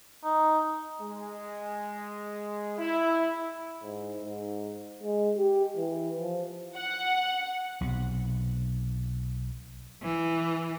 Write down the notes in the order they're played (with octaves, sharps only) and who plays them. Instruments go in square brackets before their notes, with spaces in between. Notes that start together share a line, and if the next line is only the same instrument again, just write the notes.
[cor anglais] D#4
[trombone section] G#3
E4
[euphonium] G#2
G#2
G#3
G4
E3
F3
[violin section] F#5
[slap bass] B1 C3
[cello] E3